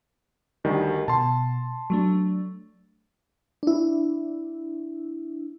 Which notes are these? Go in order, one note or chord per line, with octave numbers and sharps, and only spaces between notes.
D2 D#3 G3
B2 A5 C6
F#3 A3 D4
D4 E4